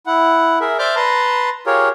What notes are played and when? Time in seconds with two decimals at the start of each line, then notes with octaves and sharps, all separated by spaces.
0.06 E4 F#5
0.60 G#4 A#4 E5
0.79 C5 D5 E5 D6 F6 G6
0.96 B4 A5 A#5 C6
1.66 F4 G4 G#4 A#4 C#5